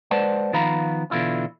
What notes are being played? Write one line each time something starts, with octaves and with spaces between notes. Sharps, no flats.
G#3 B4 C5 D5 F#5 A5
D#3 F3 B3 F5 A#5 B5
B2 D3 E3 E4 F4